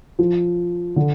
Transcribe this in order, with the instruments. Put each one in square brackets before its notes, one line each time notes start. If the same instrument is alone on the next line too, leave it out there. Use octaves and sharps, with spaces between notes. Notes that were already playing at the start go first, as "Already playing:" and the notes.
[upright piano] F3
D3